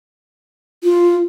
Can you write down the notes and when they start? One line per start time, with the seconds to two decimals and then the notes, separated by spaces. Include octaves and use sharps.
0.83 F4